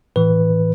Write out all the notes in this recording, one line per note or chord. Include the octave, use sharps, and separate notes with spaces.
A2 E3 B4